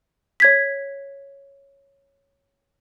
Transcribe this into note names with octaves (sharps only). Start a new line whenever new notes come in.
C#5 G#6 B6